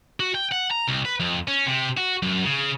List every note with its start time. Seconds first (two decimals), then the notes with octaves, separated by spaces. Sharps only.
0.20 F#4
0.35 G5
0.51 F#5
0.71 A#5
0.88 C2
1.05 B4
1.20 F2
1.48 C#4
1.66 C3
1.97 F#4
2.23 F#2
2.45 C#3